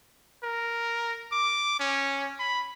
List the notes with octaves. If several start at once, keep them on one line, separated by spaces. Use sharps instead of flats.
A#4
D6
C#4
B5